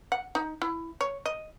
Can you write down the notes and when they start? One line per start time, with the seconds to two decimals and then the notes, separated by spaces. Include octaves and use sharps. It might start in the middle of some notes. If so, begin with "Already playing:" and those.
0.12 F#5
0.35 D#4
0.62 E4
1.01 C#5
1.26 D#5